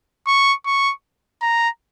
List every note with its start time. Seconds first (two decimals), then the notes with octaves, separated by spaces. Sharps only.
0.27 C#6
0.66 C#6
1.42 A#5